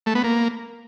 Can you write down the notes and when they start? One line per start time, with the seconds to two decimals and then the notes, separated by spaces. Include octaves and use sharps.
0.06 A3
0.15 B3
0.24 A#3